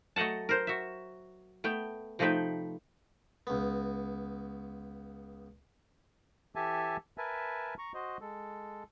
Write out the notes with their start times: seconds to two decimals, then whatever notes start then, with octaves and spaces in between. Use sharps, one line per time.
0.16 F#3 A3 D#5 F#5 A5
0.49 A#4 C5
0.67 F#4 E5
1.64 A3 B3 G5
2.19 C3 F3 A3 D#4 B4 G5
3.47 C#2 B3
6.56 E3 G4 A4 E5 G#5 A5
7.18 A#4 B4 E5 G#5 A5
7.78 A#5 C#6
7.94 F#4 C5 D#5
8.21 G#3 A4